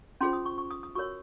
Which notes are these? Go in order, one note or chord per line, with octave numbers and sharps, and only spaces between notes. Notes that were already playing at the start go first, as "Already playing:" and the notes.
C#4 F4 G#4 C5 C6
D#6
C#6
C#6
D#6
D#6
F#4 A#4 C#5 C#6